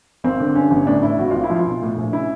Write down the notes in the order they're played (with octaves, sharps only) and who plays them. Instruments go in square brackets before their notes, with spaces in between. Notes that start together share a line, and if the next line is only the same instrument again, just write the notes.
[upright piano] G#1 C4
D3
G2 C#4
G1
A2 D4
A1 E4
G#1 F#4
G#1 F4
E4
F3 F4
B1
A2
A#1
C#3 E4